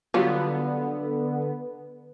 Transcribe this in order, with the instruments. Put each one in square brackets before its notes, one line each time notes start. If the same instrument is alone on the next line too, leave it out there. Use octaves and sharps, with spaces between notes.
[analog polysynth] D3 B3 [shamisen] F#3 G3 F4